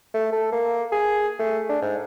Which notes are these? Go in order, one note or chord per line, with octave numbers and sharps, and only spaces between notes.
A3
A4
A#3
G#4
A3
D4
G#2